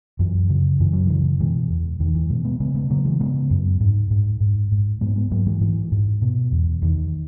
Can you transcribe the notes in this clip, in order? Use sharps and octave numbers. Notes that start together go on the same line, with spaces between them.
F#2 E3
C#3
F#2 E3
F#3
C#3 E3
B2 E3 G#3
E2
E2 D#3
E3
B2 E3 G#3
G#3 B3
C#3 G#3 B3
G#3 B3
C#3 F#3 A#3
E3 G#3
C#3 G#3 B3
F#2
G#2
G#2
G#2
G#2
G#2 G#3 B3
G#3 B3
G#2 F#3 A#3
E3 G#3
G#2 E3
G#2
B2
E2
E2 D#3